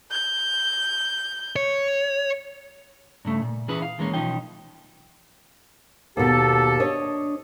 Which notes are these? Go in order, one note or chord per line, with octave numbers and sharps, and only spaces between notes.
G6
C#5
G2 C#3 A3
A#2
E3 C#4 E4 G#4 B4
F5
D#2 E3 G#3 A#3 C#4
B1 E3 F3 C#4 D#4 G5
D#2 B2 A#3 G4 A4
D4 C#5 D#5